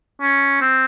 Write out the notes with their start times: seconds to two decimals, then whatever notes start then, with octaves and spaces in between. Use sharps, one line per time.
0.21 C#4
0.61 C4